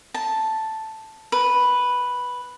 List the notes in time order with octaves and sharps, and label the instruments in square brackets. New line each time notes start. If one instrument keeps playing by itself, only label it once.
[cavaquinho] A5
B4